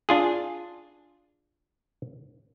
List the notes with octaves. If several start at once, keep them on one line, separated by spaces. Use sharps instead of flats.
D4 F4 G#4